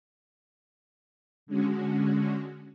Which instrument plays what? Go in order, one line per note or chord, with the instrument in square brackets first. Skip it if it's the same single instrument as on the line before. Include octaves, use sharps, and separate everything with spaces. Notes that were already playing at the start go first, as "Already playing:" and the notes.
[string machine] D3 G#3 C#4 F#4